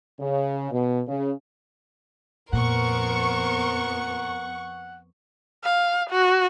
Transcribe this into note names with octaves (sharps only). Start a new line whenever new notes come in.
C#3
B2
C#3
F2 A#2 B3 A#4 C5 F#5 C#6
F5
F#4